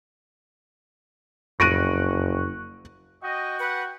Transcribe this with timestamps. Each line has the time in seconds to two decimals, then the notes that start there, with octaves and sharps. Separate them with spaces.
1.60 F#1 F2 C#6 F#6 A#6 D7 D#7
3.23 F#4 D#5 G5
3.59 B4 F#5